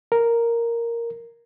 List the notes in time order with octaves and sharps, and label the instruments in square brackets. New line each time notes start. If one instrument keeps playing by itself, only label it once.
[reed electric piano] A#4